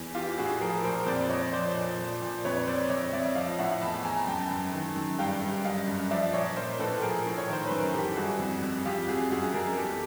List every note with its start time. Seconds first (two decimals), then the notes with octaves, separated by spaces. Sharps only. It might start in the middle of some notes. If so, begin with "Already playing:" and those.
Already playing: E2
0.15 E3 F4 G4
0.38 A2 F#4 G#4
0.61 F3 G#4 A#4
0.84 A#2 A#4 C5
1.06 F2 C5 D5
1.29 F2 C#5 D#5
1.53 F3 C5 D5
1.75 A#2
1.98 F3
2.22 A#2
2.45 F2 B4 C#5
2.67 F2 C5 D5
2.90 F2 C#5 D#5
3.13 F2 D5 E5
3.35 F3 D#5 F5
3.59 A2 E5 F#5
3.81 E2 A5 B5
4.04 E2 G#5 A#5
4.27 F#2 G5 A5
4.51 F#2
4.73 D#3
4.96 F#2
5.19 G2 F5 G5
5.42 G2
5.65 F#2 D#5 F5
5.87 F#2
6.11 F3 D5 E5
6.33 A#2 C#5 D#5
6.56 F3 A#4 C5
6.79 A2 A4 B4
7.02 F3 G#4 A#4
7.26 A2
7.38 C#5
7.48 D#3 C5
7.66 F#2 B4
7.79 A#4
7.93 E3 G4 A4
8.16 G2 F#4 G#4
8.39 F2
8.63 F2
8.85 F2 F4 G4
9.08 F2 F#4 G#4
9.31 F#2 F#4 G#4
9.54 F#2 G#4 A#4
9.77 E2 G4 A4